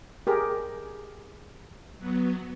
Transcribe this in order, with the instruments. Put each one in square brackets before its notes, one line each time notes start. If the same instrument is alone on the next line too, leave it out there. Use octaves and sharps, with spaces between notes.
[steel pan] G4 G#4 A#4
[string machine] F#3 B3